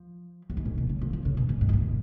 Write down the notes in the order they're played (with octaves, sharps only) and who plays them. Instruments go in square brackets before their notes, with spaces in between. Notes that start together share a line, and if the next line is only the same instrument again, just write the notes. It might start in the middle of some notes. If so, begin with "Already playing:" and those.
Already playing: [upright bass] F3
F#2
G#2
A#2
B2
C#3
F3
F3
C#3
B2
G#2
G#2
B2
A#2